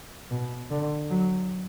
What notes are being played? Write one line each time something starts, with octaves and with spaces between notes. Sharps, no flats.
B2
D3
F#3